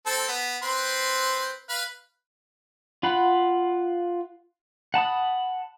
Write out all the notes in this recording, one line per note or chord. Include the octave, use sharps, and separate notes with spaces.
C4 A4 A5
B3
C4 B4 C6
B4 F5
F4 F5 F#5 B5
F#5 A5 B5 D#6